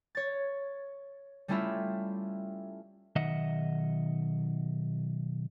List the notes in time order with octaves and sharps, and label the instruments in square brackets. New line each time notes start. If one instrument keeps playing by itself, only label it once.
[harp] C#5 A6
G3 A3 C#4 E4 F4 E5
[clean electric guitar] B1 D#3 D#5 E5 F#5